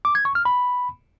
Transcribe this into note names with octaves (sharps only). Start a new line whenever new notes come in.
D6
G#6
C#6
F6
B5